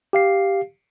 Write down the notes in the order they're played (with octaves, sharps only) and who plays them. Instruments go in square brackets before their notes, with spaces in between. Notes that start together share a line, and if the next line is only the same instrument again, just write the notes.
[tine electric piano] G4 F5 C7